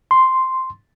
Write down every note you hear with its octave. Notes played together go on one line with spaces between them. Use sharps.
C6